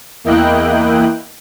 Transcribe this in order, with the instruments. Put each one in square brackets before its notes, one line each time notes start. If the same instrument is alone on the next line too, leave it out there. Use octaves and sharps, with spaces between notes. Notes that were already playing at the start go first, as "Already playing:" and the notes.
[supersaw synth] E2 A#3 E4 D#5 G5 F#6